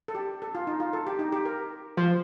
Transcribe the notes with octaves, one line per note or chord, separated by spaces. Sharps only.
A4
G4
A4
F4
D#4
F4
A4
G4
D#4
G4
A#4
F3 C5